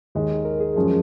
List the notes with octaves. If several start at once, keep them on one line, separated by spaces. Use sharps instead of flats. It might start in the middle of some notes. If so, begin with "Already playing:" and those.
D#2 D#3 G#3
A#4
G#4
F#2 F3 G#3 C#4